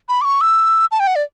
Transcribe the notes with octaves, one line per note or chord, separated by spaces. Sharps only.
B5
D6
C#6
E6
A5
G5
F#5
D5